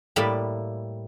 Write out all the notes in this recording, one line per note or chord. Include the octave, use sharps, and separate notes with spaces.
A2 G3 A#3 A5 B5